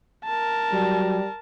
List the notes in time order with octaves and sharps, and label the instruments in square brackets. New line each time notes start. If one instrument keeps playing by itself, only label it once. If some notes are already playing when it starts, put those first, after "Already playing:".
[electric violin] A#4 A5
[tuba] F#3 [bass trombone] G3